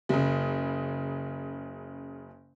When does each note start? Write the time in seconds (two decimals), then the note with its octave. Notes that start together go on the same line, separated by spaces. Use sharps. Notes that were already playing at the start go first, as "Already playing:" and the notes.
0.09 F#1 C#3